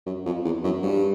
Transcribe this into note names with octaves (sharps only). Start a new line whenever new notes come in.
F#2
F2
E2
F#2
G2